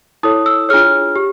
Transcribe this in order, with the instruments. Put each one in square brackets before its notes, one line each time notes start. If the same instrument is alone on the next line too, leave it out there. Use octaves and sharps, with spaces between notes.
[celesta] E4 A4 C#5 D#6
E6
D4 F4 G#4 C#5 F6
G4